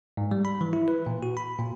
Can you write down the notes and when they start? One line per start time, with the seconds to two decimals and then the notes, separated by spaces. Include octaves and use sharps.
0.17 G#2
0.31 G3
0.45 B5
0.61 E3
0.73 E4
0.88 B4
1.06 A#2
1.23 F#4
1.37 B5
1.59 A#2